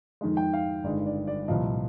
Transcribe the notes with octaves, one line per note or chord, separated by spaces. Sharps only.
F2 D#3 G#3
G5
F5
G1 G2 D#3 G#3 D5
D5
D5
C2 A#2 F3 D#5